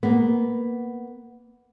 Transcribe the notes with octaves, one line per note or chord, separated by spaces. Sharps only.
A#3 B3